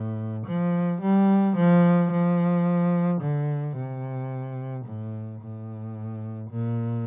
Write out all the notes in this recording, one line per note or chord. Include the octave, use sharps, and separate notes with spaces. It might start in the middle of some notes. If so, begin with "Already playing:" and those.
Already playing: A2
F3
G3
F3
F3
D3
C3
A2
A2
A#2